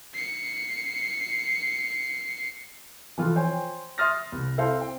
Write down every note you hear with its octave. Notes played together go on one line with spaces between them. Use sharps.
C7 C#7
E3 F3 F4 A4
C5 C#5 G5 G#5
E5 C6 D#6 F6 A6 A#6
C2
C4 E4 A4 C5 F5
G5